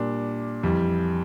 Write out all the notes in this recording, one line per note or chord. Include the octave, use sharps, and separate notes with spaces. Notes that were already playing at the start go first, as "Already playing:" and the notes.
Already playing: A#2 G3 D4
F2 E3 G3